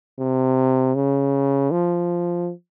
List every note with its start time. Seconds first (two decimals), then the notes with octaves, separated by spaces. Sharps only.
0.19 C3
0.95 C#3
1.71 F3